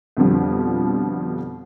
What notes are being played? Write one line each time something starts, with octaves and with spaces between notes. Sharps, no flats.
F2 B2 D3 F3 G3